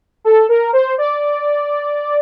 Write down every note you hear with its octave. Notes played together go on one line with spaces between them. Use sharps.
A4
A#4
C5
D5